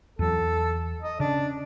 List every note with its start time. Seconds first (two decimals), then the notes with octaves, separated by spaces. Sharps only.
0.19 E2 F#3 A4
1.03 D#5
1.20 C#3 D4